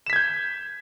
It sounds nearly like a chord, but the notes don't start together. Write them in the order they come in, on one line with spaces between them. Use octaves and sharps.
E7 B6 G#6 G6